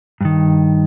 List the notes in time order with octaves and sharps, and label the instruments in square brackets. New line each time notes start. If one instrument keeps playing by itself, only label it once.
[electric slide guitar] G2 D#3